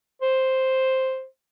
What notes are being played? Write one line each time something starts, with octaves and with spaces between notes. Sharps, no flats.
C5